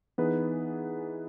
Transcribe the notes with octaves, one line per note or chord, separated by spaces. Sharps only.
E3 B3 D#4 G#4 B4